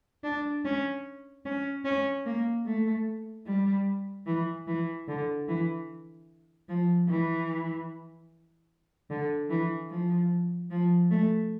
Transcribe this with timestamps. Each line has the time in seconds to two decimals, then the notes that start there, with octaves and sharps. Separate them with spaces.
0.24 D4
0.65 C#4
1.46 C#4
1.85 C#4
2.26 A#3
2.66 A3
3.46 G3
4.26 E3
4.67 E3
5.08 D3
5.48 E3
6.69 F3
7.09 E3
9.10 D3
9.50 E3
9.90 F3
10.71 F3
11.11 A3